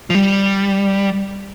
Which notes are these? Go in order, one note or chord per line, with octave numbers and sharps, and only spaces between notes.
F3
G3